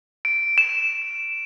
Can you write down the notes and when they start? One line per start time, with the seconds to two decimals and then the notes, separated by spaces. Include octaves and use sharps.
0.25 D7
0.58 E7